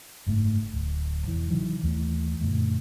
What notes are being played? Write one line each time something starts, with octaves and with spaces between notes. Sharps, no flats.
F#1 G#2 A3
D1
E1 E3
C3 D#3 E3 F#3
D#2 E3 A3
F#2 A#2 D3 A3